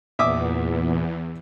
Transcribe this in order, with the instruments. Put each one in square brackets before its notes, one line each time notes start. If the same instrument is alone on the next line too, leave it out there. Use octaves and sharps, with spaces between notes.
[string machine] E2 [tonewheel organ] A#2 B3 [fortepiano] E5 D6 D#6